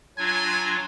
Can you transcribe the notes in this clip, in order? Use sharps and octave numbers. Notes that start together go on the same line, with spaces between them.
F#3 D4 F4 G#5